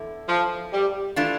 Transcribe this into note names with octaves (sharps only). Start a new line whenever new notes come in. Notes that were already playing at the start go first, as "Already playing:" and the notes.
Already playing: E2 D3 A3 E4
F3
G3
E3 A3 D4 F4